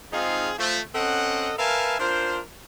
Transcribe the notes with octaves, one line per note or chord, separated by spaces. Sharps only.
G#2 C4 D#4 F4 G#4 F5
F3 A3
C4 C#4 A4 D#5 F#5
A#4 B4 E5 F5 G#5 A5
D4 F4 A#4 C5